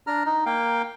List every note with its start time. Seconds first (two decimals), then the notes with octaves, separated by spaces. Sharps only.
0.07 D4 A#5 F6
0.26 D#4
0.46 A#3 F5 G5